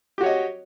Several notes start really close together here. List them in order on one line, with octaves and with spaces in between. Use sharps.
G4 F#4 C#5 D#5